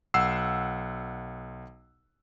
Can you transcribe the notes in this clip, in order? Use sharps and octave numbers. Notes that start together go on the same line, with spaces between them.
B1 F#5 E6 C7